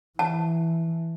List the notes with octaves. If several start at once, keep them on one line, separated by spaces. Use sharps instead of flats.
E3 A5